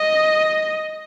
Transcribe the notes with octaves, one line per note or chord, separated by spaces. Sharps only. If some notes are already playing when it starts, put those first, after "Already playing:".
Already playing: D#5